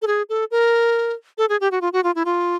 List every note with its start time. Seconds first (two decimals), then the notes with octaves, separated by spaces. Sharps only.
0.02 A4
0.07 G#4
0.29 A4
0.51 A#4
1.38 A4
1.49 G#4
1.61 G4
1.72 F#4
1.81 F4
1.93 F#4
2.04 F4
2.15 E4
2.25 F4